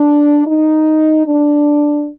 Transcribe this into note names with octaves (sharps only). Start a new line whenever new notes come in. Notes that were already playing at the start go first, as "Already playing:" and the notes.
Already playing: D4
D#4
D4